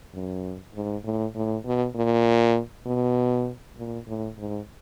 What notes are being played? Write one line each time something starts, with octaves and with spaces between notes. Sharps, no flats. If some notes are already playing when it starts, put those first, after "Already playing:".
F#2
G#2
A2
A2
B2
A#2
B2
A#2
A2
G#2